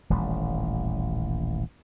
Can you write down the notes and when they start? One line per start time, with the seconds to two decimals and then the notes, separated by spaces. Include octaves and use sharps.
0.10 D#1 A1 D#2 G3